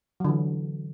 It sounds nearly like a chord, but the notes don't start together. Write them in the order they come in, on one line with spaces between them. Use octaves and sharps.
F#3 D3 E3